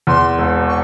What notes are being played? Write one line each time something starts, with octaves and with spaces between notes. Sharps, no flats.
E2 C6
E1
C#6